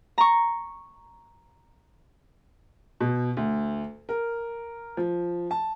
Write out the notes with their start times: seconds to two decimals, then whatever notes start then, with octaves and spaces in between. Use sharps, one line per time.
0.18 A#5 C#6
3.00 B2
3.37 D2
4.09 A#4
4.97 F3
5.51 A5